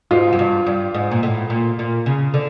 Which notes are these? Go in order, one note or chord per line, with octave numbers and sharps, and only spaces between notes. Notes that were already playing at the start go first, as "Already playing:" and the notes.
G#2 F4
F#2
G2
G2
G#2
A#2
A2
A#2
A#2
C#3
D3